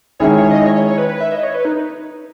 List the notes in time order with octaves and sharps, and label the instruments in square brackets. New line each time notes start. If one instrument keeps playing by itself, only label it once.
[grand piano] D#3 G#3 C#4 E4 G#4 [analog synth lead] C#5
[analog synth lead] C#5
D#5
C#5
C#5
C#5
B4
B4
E5
D#5
C#5
B4
D#4